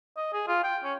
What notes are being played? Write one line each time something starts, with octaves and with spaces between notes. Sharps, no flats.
D#5
G#4
F4
G5
C#4